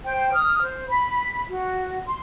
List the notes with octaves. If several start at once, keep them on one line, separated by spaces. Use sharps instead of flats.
C5 G5
D#6 F6
C5
B5
F#4
C6